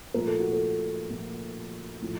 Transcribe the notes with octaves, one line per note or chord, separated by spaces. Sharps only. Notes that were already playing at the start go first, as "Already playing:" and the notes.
A#2 F3 A3 A#4
A4
F#4
A4
A#2 F3 A3
A2 F3